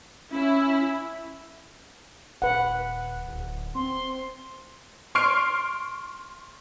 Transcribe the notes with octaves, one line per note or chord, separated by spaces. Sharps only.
C#4 E4
D#1 B4 F#5
D1
C4 C6
C6 C#6 F6 C7 D7